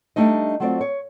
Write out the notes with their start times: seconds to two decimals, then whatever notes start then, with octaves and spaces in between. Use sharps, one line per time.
0.16 G3 A3 D4 D#4 D#5
0.60 F#3 A3 C4 F4 D5
0.81 C#5